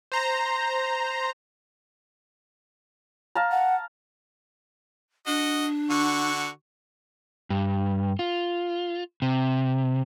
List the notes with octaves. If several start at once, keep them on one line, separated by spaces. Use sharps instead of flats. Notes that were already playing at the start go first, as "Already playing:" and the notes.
C5 A#5
F5 A5 A#5
F#5
D4 F#4 D#5
D3 F#4 C#6
G2
F4
C3